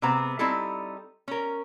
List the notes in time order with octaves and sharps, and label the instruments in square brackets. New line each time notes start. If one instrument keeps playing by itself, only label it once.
[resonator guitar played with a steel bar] C3 G#3 B3 C4 A#5
G3 C4 D#4 E4 A4
C#4 A#4